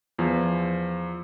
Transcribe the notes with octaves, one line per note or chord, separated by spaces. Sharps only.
E2 F3